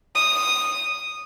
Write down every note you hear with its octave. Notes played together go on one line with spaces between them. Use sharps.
D#6